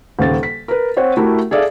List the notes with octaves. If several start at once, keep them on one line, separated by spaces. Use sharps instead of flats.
D#1 C#3 A6
B6
A#4 B4
C4 C5 C#5 F#5
A3 E4 F#4 G4 A#4
G#4 A4 D5 E5 F5